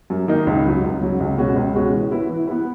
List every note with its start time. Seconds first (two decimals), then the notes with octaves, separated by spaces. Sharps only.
0.10 F#2
0.28 D#3 A#3 D#4
0.47 C#2
0.65 C#3 F#3
0.83 C#2
1.01 C#3 F#3
1.20 C#2
1.38 B2 G#3 C#4 F#4
1.56 C#2
1.75 B2 G#3 C#4 F#4
1.93 E3
2.11 B3 E4 B4
2.29 E3
2.47 B3 E4 B4